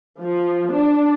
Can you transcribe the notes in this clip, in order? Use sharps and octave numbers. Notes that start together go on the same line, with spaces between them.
F3
D4